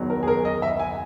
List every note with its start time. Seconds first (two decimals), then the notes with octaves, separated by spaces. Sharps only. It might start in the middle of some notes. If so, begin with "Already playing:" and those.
Already playing: F#1 E2 D#3 F#3
0.10 A#4
0.23 G#4
0.27 A#4
0.45 D#5
0.62 E5
0.80 G#5